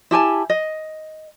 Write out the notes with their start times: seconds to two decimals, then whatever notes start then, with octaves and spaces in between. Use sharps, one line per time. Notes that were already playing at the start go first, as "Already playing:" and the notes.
0.11 E4 G4 G#5 A5
0.50 D#5